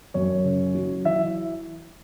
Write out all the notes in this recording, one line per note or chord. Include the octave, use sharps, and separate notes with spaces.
F#2 C#5
C#3
F#3
E3 E5